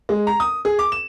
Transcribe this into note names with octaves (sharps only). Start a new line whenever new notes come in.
G#3
A#5
D#6
G#4
D6
E7